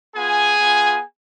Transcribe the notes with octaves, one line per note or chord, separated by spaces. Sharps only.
B3 F4 G#4 G#5
B3 F4